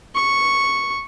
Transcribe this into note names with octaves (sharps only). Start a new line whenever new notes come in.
C#6